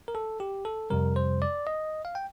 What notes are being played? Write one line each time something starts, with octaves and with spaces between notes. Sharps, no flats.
A#4
A4
G4
A4
F2 C3 G3 A#4
C5
D5
D#5
F5
G5